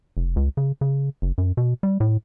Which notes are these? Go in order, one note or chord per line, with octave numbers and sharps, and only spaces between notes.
F1
C#2
C#3
C#3
F#1
F#2
B2
G3
A2